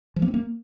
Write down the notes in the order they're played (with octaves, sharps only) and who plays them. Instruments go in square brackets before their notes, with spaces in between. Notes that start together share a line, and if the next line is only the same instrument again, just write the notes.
[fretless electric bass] F3
A#3
C4
A#3